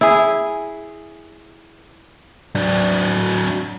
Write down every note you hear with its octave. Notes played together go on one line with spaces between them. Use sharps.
E4 G#4
F#3 D4